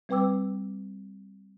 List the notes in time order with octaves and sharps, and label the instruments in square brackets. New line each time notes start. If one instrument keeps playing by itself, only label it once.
[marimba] G3 C4 B4 G5 D6 E6